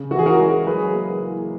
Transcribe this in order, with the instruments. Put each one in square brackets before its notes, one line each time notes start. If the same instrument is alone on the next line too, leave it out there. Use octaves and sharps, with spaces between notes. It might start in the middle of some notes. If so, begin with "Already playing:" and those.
Already playing: [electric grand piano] C#3
[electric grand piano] E3 [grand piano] F#4
[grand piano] G#4
F#4 A#4
[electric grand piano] G#3
[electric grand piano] F#3 [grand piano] G#4 B4
[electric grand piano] A#3
E4